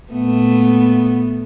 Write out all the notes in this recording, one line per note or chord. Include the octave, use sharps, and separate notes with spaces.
A#2 A3 B3